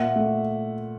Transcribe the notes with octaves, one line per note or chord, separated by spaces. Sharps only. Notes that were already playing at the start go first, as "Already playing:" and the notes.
Already playing: A#2 E5 F#5
A3